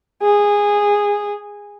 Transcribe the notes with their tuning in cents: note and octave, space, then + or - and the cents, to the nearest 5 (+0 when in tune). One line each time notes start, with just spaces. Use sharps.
G#4 -15